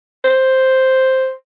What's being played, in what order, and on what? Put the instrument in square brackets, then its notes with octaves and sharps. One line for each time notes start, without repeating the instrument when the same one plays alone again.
[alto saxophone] C5